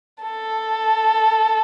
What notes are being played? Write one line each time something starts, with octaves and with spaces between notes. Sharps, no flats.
A4